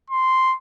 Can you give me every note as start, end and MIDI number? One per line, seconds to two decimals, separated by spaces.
0.10 0.55 84